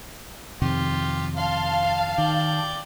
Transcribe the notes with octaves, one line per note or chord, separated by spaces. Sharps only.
F2 C3 D#3 F4 G4
F5 A5 C6
D#3 D5 G5